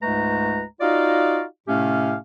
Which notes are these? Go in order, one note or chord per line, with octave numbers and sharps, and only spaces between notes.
C#2 G#2 G#3 A3 B4 A#5
D#4 F4 F#4 D5 D#5 F5
A2 C3 A3 C#4 G4 F5